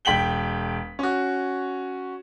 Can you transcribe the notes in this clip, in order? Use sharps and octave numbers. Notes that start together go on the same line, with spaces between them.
E1 G5 B6 F#7 G7
C#4 F#4